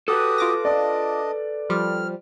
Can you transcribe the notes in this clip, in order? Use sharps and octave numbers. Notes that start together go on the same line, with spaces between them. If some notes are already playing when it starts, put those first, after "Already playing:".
F#4 G4 A4 B4 D#6
F4 D6 A#6
D4 D5 D#5
F3 G3 F6